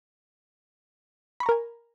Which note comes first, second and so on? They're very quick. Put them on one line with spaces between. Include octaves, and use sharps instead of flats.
B5 C#6 A#5 A#4 G#5